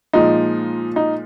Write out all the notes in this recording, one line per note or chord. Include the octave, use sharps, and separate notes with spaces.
A#2 F3 G#3 D#4
D#4